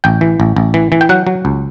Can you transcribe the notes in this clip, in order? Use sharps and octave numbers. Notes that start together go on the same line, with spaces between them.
A1 G5
E3
A1
A1
E3
E3
G5
F#3 F#5
F#3
C#2